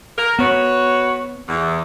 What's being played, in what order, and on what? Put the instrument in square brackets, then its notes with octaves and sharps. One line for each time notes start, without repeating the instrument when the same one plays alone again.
[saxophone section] A#4
[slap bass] B3 [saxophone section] F#4 B4 C#5
[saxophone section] E2